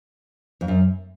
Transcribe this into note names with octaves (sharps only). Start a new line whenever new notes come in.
F2
F#2